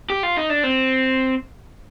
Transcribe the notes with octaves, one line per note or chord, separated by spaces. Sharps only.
G4
F4
D#4
D4
C4